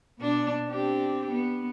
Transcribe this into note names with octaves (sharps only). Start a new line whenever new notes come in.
B2 D4
C4 D4 G4
B3